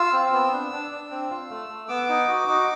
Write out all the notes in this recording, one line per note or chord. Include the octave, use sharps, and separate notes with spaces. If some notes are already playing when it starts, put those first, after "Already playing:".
Already playing: F4 E6
C4
B3
D4
D4
D4
C4
F4
A3
A3
B3 D6
D#4
F#4
D#4